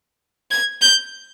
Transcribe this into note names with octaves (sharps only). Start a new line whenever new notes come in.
G#6
G6